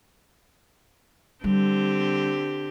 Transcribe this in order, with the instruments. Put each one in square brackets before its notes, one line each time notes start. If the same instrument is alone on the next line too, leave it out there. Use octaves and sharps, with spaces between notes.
[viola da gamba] D3 C4 G4 [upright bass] G3